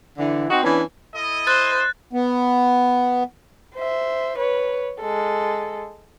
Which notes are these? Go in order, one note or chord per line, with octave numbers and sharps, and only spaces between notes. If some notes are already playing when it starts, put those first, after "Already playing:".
D3 E3
C4 D#4 F#4
E3 B3 C#4 D4
E4 A4 D#5
C5 F#6 A6
B3
C5 E5
B4 C#5
G#3 A4